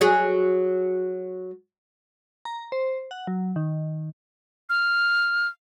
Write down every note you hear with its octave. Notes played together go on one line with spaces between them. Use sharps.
F#3 G#4
A#5
C5
F#5
F#3
D#3
F6